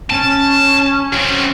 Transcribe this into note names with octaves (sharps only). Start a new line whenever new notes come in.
C#4 A5
F#3 C4